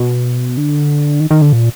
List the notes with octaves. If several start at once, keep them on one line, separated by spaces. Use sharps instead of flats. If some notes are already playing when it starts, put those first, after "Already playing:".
Already playing: B2
D3
D#3
D#3
D3
A#2